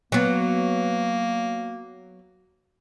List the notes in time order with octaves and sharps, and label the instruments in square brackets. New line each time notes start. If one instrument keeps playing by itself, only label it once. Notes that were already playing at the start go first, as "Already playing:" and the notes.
[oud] F#3 B3 [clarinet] A#3